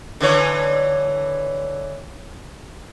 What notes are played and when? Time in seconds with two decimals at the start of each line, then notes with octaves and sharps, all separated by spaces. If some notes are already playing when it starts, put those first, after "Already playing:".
0.21 D3 E3 C#5